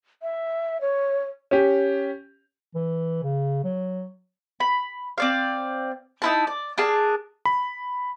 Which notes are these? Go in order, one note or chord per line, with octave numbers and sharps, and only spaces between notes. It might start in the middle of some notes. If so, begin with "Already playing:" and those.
E5
C#5
C#4 G4
E3
C#3
F#3
B5
C4 D5 F5
D#4 E4 A5
D5
D4 G#4 A#4 A5
B5